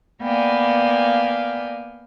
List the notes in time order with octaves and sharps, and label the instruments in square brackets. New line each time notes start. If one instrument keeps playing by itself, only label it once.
[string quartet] A#3 B3 D5 F5 G5 G#5